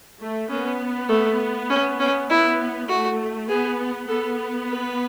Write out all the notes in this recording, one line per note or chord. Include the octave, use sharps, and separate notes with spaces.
A3
B3 C#4
A3
C#4
C#4
B3 E4
A3 F#4
B3 G#4
B3 A4
B4